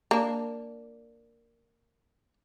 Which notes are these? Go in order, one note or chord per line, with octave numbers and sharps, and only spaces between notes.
A#3 D4